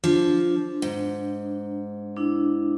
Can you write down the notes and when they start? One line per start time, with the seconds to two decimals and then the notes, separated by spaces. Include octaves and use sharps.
0.04 F3 D4
0.82 G#2
2.16 D4 E4